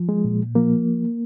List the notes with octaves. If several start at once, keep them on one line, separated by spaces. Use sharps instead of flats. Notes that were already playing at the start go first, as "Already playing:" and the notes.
Already playing: F3
G#3
A#2
F3 A#3